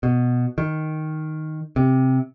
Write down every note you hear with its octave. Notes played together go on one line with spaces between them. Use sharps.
B2
D#3
C3